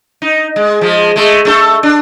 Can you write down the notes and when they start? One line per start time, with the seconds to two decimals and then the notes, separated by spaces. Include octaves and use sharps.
0.22 D#4
0.56 G#3
0.81 F3 G#3
1.16 G#3 A3
1.45 A3 C#4 A4
1.83 D4